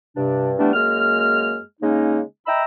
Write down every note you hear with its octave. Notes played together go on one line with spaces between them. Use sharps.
G2 C3 D4
E3 G3 A3 B3 D4
F#2 G#3 A#3 F6
C#3 G#3 A#3 C#4 D#4
D#5 E5 G5 A#5 B5 E6